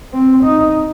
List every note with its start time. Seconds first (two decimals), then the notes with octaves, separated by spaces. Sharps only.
0.13 C4
0.44 D#4